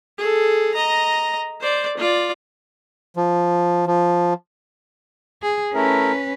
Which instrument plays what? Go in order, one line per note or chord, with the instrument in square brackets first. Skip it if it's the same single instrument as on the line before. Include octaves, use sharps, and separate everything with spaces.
[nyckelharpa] G#4 A4
D#5 A#5
C5 D5
F4 D5
[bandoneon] F3
F3
[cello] G#4
[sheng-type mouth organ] A3 E4 A#4 [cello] C#4 B4